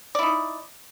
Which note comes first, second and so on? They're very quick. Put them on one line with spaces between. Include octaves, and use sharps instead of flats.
D5 E4 D#4